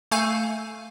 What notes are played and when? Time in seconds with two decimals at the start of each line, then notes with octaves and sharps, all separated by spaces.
0.11 A3 F5 G#5 G6